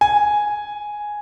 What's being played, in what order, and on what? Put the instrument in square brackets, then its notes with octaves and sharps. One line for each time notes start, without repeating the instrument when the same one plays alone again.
[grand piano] G#5